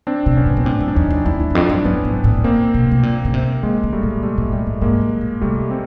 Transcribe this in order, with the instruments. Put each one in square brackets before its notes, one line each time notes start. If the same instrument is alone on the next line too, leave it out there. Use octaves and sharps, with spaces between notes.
[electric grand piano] C4 D4
[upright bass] C3
[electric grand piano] B3 C#4
[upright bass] B2
A#2
[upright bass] A2 [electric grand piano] C4 D4
[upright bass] F#2
[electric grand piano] D4
[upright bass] E2 [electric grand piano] C#4 D#4
[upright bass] F2
[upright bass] E2 [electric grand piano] D4 E4
[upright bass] F2
E2
[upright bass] F2 [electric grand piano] C4 D4
[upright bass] F#2
[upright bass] G2 [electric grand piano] B3 C#4
[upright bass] G#2
A2
[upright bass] A#2 [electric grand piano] A#3 C4
[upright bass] B2
B2
A#2
C#3
C3
[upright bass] C#3 [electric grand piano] G#3 A#3
[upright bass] C#3
[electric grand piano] G3 A3
[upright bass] A#2
[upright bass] B2 [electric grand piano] G3 A3
[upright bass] A#2
[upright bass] A#2 [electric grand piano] G3 A3
[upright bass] A2
[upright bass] G#2 [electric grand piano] G#3 A#3
[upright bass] A2
A#2
[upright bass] C3 [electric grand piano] G3 A3
[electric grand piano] C4